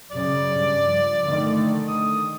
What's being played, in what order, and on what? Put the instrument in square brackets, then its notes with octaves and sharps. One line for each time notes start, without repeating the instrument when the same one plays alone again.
[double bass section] F#2 C#3 [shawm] D5
[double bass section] G2
F3
D3 D#3 A3
[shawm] D#6